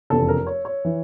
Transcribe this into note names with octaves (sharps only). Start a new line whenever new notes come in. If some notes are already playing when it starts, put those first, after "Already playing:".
F1 E2 C#3 A4
A#4
C#5
C#5
E3